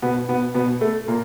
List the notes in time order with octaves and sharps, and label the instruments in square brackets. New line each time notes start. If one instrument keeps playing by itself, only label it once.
[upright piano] B2 B3
B2 B3
B2 B3
A3
A#2 A#3